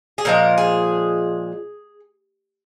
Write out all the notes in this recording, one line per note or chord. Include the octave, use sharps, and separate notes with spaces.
G#4
A#2 F3 G#3 A#4
G#4